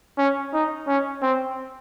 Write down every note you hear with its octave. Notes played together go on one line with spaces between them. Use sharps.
C#4
D#4
C#4
C4